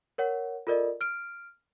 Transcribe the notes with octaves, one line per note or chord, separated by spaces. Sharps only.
A#4 C#5 F#5
F4 A4 A#4 D5 D#5
F6 D7